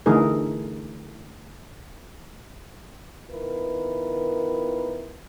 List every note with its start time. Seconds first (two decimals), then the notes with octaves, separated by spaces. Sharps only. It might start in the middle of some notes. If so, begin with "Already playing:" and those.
0.06 D3 E3 A3 D#4 G#4 A#4
3.30 D#3 B3 E4 F4 A#4 B4